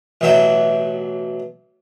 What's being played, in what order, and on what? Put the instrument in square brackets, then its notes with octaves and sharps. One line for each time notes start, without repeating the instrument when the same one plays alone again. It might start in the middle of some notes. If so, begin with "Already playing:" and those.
[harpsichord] A1 B2 F#3 E5 G5